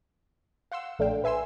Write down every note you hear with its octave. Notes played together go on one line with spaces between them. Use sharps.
F5 F#5 C6 E6
A#1 A3 D4 F5 G5
B4 E5 G#5 C6 E6